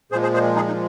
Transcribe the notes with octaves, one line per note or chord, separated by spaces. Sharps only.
A#2 F3 G#3 G#4 C5
G#4 C5
G#4 C5
D#4 G#4
D#4